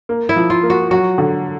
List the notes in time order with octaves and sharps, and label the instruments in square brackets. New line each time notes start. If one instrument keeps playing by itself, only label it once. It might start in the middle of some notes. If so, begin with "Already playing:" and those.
[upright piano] A#3
[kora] E4
[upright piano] F3
[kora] F4
[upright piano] A#3
[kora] F#4
[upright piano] F#3 [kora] F#4
[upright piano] D3